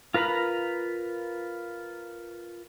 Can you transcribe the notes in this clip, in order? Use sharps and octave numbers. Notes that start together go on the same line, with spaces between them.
F4 A#4 B4 A#5 B5